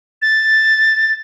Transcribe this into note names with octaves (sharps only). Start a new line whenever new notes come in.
A6